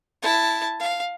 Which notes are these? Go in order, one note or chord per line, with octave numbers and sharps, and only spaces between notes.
E4 A5
F5